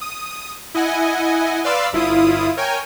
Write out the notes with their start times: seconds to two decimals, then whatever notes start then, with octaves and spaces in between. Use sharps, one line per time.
0.01 D#6
0.74 E4 D#5 F#5 G#5
1.64 B4 D5 F5 C6 D6 E6
1.93 G1 E4 F4 D#6
2.57 A#4 C#5 G5 G#5